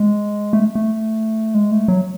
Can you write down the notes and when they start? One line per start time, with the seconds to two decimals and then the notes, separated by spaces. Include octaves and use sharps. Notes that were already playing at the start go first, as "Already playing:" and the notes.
Already playing: G#3
0.53 A3
0.75 A3
1.54 G#3
1.71 A3
1.88 F#3